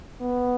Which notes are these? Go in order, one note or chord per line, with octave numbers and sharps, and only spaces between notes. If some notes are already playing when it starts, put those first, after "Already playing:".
B3